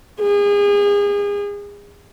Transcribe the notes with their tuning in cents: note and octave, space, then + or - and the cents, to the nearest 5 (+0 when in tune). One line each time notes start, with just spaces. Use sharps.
G#4 -35